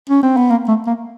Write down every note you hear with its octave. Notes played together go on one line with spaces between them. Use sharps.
C#4
C4
B3
A#3
A3
A#3